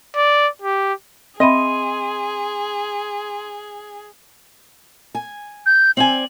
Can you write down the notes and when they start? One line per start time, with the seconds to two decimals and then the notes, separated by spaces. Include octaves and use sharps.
0.16 D5
0.62 G4
1.40 C4 G#4 D#5 E5 B5 C6 D#7
5.15 G#5
5.66 G6
5.97 C4 D5 G#5 F#7